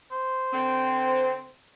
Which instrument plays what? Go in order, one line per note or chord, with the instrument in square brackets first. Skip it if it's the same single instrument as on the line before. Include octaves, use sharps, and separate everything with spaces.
[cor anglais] C5
[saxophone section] D3 C4